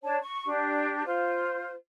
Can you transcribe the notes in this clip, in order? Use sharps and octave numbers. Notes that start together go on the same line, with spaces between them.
D4 C#5 A5
C#6
D4 G4
F4 C5